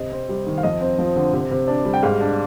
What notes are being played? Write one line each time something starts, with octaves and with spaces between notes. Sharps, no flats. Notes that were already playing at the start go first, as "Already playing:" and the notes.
Already playing: C3 D#5
C4
G3
D#3
F5
F2 D#5
C4
F3
D3
C3
C3
D4
G3
G5
G#2 F5
D4